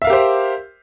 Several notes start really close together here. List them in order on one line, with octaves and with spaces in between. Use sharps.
E5 F5 A#4 G4 C5